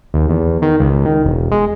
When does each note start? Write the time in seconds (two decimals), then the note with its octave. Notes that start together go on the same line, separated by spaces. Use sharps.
0.14 D#2
0.29 E2
0.62 D#3
0.80 C#2
1.05 D#3
1.25 E1
1.51 G#3